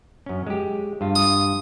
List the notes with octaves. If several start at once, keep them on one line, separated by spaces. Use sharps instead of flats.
F#2 C#4
G#3 G4
G2 F4
D#6